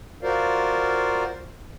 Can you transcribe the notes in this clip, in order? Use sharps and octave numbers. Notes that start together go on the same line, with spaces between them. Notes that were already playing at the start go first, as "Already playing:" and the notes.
F4 F#4 A#4 C5 D5 F5